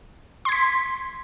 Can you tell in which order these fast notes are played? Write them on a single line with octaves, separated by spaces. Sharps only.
C6 G#6 B6